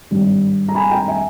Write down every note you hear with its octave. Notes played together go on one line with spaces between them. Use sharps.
G#1 G2 G3
A#5
G#5 B5
G5 A#5
E5 G#5